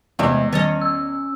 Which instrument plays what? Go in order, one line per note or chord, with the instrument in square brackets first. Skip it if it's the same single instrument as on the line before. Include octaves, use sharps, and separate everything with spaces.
[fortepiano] E2 [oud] C3 G#3 E5
[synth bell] D#3 A6 [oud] C#4 C#5 D#5
[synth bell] E6